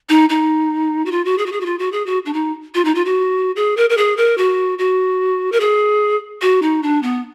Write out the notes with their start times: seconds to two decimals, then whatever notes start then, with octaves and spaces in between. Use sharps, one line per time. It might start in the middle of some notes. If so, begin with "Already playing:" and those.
0.09 D#4
0.29 D#4
1.06 F#4
1.12 F4
1.25 F#4
1.38 G#4
1.46 F#4
1.52 G#4
1.61 F#4
1.66 F4
1.79 F#4
1.92 G#4
2.06 F#4
2.26 D4
2.34 D#4
2.75 F4
2.85 D#4
2.95 F4
3.05 F#4
3.56 G#4
3.77 A#4
3.90 A#4
3.97 G#4
4.17 A#4
4.38 F#4
4.79 F#4
5.52 A#4
5.60 G#4
6.42 F#4
6.62 D#4
6.83 D4
7.03 B3